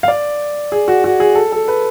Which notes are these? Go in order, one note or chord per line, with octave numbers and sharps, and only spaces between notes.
F5
D5
G#4
F#4
F#4
G#4
A4
A4
B4